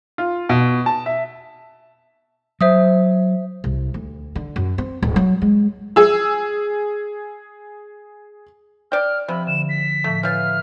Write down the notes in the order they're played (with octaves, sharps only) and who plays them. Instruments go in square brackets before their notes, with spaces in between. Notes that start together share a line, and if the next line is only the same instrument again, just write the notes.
[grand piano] F4
B2
A5
E5
[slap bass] F#3 [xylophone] C5 E5 D#6
[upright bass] C2
D2
D3
F#2
C4
D1
F#3
G#3
[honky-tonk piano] G#4 E6
[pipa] D5 G5 [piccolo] F6
[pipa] C3 [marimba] F3 [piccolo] B5
[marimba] D3 [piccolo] E7
[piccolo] B6
[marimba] A2 F3 [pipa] A3
[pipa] E3 F5 [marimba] C#5 G6 A6 [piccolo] F6